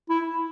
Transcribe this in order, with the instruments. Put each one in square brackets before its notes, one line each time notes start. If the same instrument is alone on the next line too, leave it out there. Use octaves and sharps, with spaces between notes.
[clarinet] E4